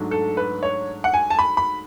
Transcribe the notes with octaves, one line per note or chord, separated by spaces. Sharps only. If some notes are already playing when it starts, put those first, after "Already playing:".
Already playing: G#2 F#3 A3 D4
A4
B4
C#5
F#5
G#5
A5
B5
B5